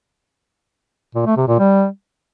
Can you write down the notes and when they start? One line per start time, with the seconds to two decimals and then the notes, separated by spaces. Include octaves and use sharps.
1.15 A#2
1.26 A3
1.37 C3
1.48 A#2
1.59 G3